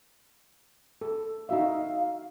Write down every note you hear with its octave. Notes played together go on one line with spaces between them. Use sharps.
A4
D#4 F#4 E5 F5